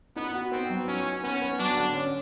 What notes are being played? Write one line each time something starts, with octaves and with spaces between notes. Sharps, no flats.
B3 D#4
F#4
B3 C4
F#3
C#4 D#4
D#4
B3 C#4
B3
F#3 D4
D3
C#4